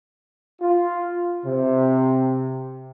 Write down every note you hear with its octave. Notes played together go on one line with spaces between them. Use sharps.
F4
C3